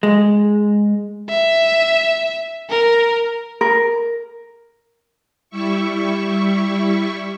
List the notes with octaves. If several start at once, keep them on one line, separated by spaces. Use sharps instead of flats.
G#3
E5
A#4
A#4
G3 E4 E5 C#6